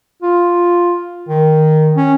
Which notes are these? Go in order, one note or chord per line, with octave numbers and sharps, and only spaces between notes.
F4
D#3
C#4